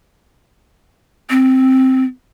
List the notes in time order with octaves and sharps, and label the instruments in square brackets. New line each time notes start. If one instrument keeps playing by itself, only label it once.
[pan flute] C4